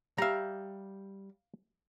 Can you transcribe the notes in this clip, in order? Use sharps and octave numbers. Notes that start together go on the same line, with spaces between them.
G3 E5 F5 A#5